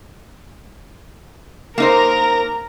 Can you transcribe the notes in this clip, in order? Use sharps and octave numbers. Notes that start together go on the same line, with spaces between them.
A#3 D#4 A#4 C5 A#5